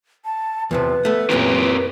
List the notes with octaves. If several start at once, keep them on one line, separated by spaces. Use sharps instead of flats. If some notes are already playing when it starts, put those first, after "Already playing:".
A5
E2 C3 F3 B4
A3 B3
F#2 A#2 E3 C4 G4 A#4